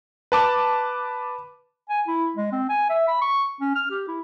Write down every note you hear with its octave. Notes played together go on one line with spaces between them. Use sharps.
B4 A5 D6
G#5
E4
G#3
C4
G#5
E5
B5
C#6
C#4
F6
G4
E4